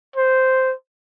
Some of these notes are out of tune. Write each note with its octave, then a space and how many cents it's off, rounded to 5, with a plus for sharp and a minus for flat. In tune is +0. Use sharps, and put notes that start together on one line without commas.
C5 -5